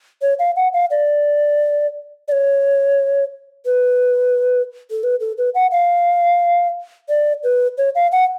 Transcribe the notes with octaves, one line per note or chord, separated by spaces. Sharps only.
C#5
F5
F#5
F5
D5
D5
C#5
B4
A4
B4
A4
B4
F#5
F5
D5
B4
C#5
F5
F#5